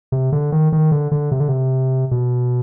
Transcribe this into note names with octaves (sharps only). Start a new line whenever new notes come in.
C3
D3
D#3
D#3
D3
D3
C3
D3
C3
B2